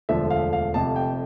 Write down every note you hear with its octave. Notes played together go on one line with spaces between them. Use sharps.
E1 D2 D3 F3 E5
F5
F5
F1 F2 C3 A5
G5